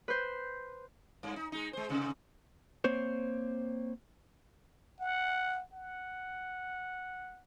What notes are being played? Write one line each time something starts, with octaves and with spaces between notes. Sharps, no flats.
B4 C5
G2
D#4
G#3 D#4
G#3 C5
G#2 C3
A#3 C4 C5 C#5
F#5
F#5